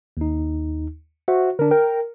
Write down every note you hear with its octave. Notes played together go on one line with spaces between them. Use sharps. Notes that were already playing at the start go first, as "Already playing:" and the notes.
D#2 D#4
F#4 C5 E5 F#5
D3 D4 A#4
A#4 G5